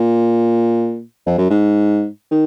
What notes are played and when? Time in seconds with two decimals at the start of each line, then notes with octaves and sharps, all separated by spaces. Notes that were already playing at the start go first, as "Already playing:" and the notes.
Already playing: A#2
1.26 F2
1.38 F#2
1.50 G#2
2.31 D#3